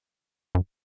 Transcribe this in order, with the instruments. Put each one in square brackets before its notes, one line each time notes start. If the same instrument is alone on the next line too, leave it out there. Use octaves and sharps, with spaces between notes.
[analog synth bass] F#2